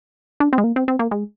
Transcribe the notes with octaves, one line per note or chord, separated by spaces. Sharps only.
D4
C4
G#3
A#3
C4
C4
A#3
G#3